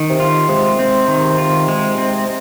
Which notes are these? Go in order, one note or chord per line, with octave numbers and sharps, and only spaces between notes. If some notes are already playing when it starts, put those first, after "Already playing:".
Already playing: D#3
C3
F4
C3 G#3
C4
D#3
F4
G#3
C4